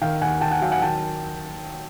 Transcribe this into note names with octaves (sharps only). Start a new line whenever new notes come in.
D#3 F5 G5
D#2 F#5 G#5
D#2 G5 A5
F#5 G#5
F#3 F5 G5
F#5 G#5
D#3 G5 A5